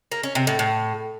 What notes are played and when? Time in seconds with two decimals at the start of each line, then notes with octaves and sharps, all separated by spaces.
0.12 A#3
0.23 C#4
0.35 C3
0.47 A2
0.59 A2